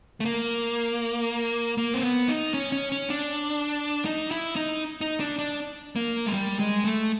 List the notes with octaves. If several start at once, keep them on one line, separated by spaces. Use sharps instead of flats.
A3
A#3
A#3
C4
B3
D#4
C#4
C#4
C#4
D4
D#4
E4
D#4
D#4
D4
D4
A#3
G#3
G3
G#3
A3